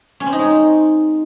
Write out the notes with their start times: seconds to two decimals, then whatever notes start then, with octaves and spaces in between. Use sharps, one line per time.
0.20 C#4
0.26 C4
0.33 D#4
0.39 G#3